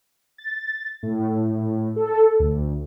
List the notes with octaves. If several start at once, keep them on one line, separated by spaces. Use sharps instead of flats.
A6
A2
A4
D2